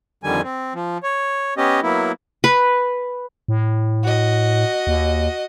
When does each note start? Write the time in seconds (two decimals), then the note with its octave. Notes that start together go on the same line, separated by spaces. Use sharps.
0.24 F2 D3 D#3 G3 G#5
0.43 C4
0.74 F3
1.03 C#5
1.57 B3 C#4 G4 D#5
1.83 F#3 A#3 B3 E4
2.44 B4
3.48 A2
4.04 F#4 D#5
4.87 D#2